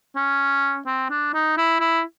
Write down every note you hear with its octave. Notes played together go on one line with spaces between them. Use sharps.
C#4
C4
D4
D#4
E4
E4